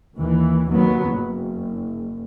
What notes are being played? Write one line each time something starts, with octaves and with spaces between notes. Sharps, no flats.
D#2 E3
D#2 F#3 B3
F#1